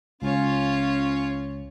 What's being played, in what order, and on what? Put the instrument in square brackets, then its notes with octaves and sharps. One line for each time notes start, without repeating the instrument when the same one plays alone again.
[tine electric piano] C#2 [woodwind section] C#4 [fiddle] F4 C#5